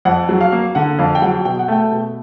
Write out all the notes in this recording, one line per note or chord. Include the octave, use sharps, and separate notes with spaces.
F2 F#5
F#3
F5
A#3
D3 F#5
F2 F5
G5
F#3 F#5
B2 G5
F#5
A3 G5
B2